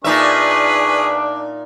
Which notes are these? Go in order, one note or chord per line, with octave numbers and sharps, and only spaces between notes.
A#2 D4 D#4 G#4 B4 E5 C#6